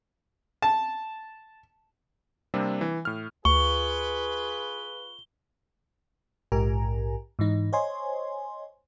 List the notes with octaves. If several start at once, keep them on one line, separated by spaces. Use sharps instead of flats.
A5
C3 G3 A#3 C4 D4
E3
A2 F6
D2 F4 G#4 B4 C#6 G7
A#1 G#2 G4 A#4 G#5 A#5
G#2 E3 D#4
C5 C#5 D#5 G#5 C6